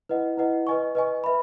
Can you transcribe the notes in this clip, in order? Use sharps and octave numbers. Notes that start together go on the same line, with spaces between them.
E4 B4 D#5 F#5
E4 B4 D#5 F#5
B4 D#5 G#5 C#6
B4 D#5 G#5 C#6
B4 E5 B5